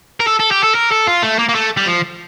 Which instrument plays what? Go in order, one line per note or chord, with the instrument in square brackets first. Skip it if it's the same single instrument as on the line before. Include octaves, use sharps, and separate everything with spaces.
[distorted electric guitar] A#4
A4
A4
G4
A4
A#4
A4
F4
A3
A#3
A#3
A3
G3
F3